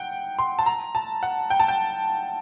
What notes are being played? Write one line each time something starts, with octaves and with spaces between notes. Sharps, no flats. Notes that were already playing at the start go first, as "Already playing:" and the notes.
Already playing: F#5 G5
C6
A5
A#5
A5
F#5
G5
A5
G5